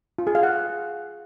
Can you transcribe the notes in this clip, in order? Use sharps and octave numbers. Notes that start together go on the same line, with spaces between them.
F4
G#4
F5
F#5